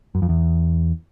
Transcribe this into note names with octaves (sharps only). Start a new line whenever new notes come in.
F#2
F2
E2